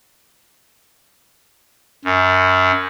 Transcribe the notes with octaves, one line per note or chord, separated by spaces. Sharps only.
F#2